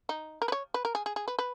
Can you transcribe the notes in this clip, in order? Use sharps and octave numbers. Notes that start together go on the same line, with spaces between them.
D#4
A#4
B4
C#5
B4
A#4
G#4
G#4
G#4
B4
B4